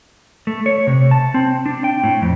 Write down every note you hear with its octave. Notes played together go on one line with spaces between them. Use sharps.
A3
C#5
C3
A5
C4
D4
G5
A2
F2